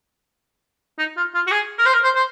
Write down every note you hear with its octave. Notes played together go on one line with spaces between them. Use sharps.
D#4
F4
F4
F#4
G#4
A#4
C5
A#4
C5
C5